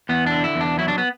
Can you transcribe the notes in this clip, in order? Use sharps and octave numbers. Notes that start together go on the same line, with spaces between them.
E2 B3
D4
D3
E4
E2
D4
F#3 E4
D4
B3